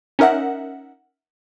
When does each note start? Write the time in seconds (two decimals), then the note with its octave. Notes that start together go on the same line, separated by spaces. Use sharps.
0.19 C#4 D#4 A#4 E5 F#5